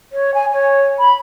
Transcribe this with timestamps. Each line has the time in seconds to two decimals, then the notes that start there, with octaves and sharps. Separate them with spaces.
0.13 C#5
0.34 G#5
0.52 C#5
0.99 B5